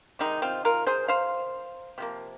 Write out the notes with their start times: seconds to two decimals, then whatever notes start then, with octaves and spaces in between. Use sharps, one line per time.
0.19 C3 D#3 G#3 D#4
0.42 C4 F4
0.65 F4 A#4
0.87 G#4 C5
1.08 C5 F5
1.98 C3 F3 A#3